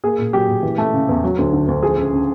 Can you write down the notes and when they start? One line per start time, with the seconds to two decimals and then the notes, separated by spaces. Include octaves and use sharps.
0.04 A#3 G#4
0.19 A#2
0.33 F#3 G4
0.48 A#2
0.63 E3
0.78 A3
0.94 C#3
1.09 E2
1.23 F#3
1.39 D2
1.53 D3
1.68 D2
1.82 F3 G#4
1.97 C#2
2.12 C#3